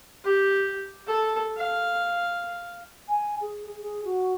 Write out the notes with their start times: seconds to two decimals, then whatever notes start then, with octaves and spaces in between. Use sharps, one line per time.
0.24 G4
1.07 A4
1.57 F5
3.08 G#5
3.41 G#4
3.66 G#4
3.81 G#4
4.05 F#4